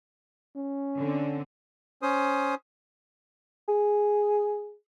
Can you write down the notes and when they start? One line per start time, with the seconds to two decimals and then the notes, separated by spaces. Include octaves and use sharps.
0.57 C#4
0.97 D3 C4
2.02 C#4 C5 D#6
3.68 G#4